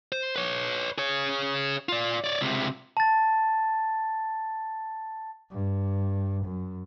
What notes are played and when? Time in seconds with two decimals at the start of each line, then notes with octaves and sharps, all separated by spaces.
0.12 C5
0.36 B4 C#5
0.98 G#4 C#5
1.89 F4 D5
2.24 C#5 D5
2.41 C#2 C3
2.97 A5 A6
5.52 G2
6.45 F#2